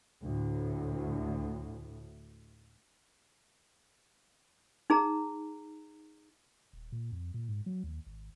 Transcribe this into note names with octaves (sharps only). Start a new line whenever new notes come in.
D2 A2
D#4 G#4 A#5
D#1
A#2
F2
A#2
G#2
F#3
D#2
G#1